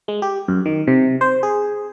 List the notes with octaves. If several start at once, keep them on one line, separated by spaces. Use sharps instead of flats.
G#3
G4
F#2
D#3
C3
C5
G#4